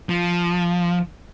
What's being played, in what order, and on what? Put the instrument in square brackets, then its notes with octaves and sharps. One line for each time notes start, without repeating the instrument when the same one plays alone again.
[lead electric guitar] F3